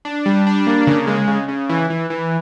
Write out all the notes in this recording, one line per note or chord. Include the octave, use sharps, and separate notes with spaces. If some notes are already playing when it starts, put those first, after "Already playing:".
D4
G3
D4
A#3
C#3
G#3
C#3
C#3
E3
E3
E3